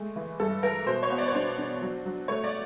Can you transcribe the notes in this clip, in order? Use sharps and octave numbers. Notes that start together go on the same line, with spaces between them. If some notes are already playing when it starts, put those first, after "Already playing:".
Already playing: G#3 A3
E3
G2 A4
E3 A#4
B2 C5
C#5
B3
D5
C#5
D4 C5
D4
F#3
F#3
A3 C#5
D5